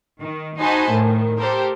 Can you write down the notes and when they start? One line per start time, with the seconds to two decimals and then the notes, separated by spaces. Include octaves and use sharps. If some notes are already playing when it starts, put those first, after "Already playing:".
0.20 D#3
0.59 D#4 F#4 C5 G#5 A5 B5
0.90 A2 D#3
1.38 G4 A4 A#4 C5